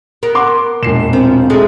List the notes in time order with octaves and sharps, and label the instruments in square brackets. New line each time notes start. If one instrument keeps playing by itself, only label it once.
[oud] B3 A#4
[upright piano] F#5 C6 D6
[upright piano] E1 C7 E7 [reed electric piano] A#2
[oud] F3 [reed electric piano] C4
[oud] G#2 G#3 A3